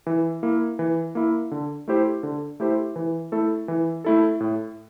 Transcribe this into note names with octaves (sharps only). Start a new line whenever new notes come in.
E3
A#3 E4
E3
A#3 E4
D3
A3 E4 G4 C5
D3
A3 E4 G4 C5
E3
A3 E4 A4
E3
A3 E4 A4
A2